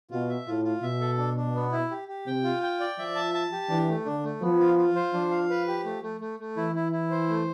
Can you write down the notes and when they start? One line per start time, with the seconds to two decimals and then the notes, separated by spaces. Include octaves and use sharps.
0.11 B2 F4
0.29 E5
0.47 A2 F4
0.65 F4
0.83 B2 E5
1.01 A4
1.18 D4
1.37 D4
1.55 B3
1.72 E4
1.91 G4
2.08 G4
2.27 C3 G5
2.44 F4
2.63 G5
2.80 D5
2.98 F3 E5
3.15 A5
3.34 A5
3.52 G4
3.69 E3 D4
3.88 A3
4.05 D3 D4
4.24 A3
4.41 F3 B3
4.60 F4
4.78 F4
4.96 C5
5.14 F3 D4
5.31 F5
5.50 B4
5.68 G4
5.85 A3
6.03 A3
6.21 A3
6.40 A3
6.57 E3 E4
6.76 E4
6.92 E4
7.11 C5
7.29 A3